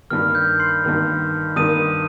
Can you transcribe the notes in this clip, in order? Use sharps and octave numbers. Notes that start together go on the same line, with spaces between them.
G2 D#3 A#3 F6
G6
C6 C7
G2 D#3 A#3
G2 D#3 A#3 D#6 D#7